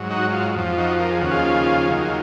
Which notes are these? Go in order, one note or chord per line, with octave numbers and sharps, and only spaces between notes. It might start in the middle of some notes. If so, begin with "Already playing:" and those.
Already playing: G#2 F#3
D#4 F#4
F4
F2 F3
D#4 F#4
A#4
G#4
D#2 C#3 F3 F#4
F4 G#4
D#2 D#3 F#3